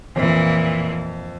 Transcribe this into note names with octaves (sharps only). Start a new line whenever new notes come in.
F2 A#2 E3